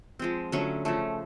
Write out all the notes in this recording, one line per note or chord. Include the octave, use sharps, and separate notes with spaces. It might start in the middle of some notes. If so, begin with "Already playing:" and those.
F3 G#3 C4
D3 F#3 A3 C#4
C#3 F3 A3